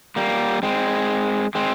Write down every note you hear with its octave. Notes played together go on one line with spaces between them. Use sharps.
G3 A#3
G#3 C4
G#3 C4